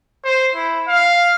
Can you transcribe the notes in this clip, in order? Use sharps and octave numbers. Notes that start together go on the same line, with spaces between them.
C5
E4
F5